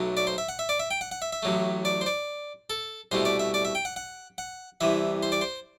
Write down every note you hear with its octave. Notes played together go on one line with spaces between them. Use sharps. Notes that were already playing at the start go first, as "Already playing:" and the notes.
Already playing: B1 B2 F#3 A3
D5
C5
E5
F#5
E5
D5
E5
G5
F#5
F#5
E5
E5
A1 A2 F#3 A3
D5
C5
D5
A4
C2 B2 A3 C5
D5
E5
D5
E5
G5
F#5
F#5
F#5
C2 C3 E3 E5
C5
D5
C5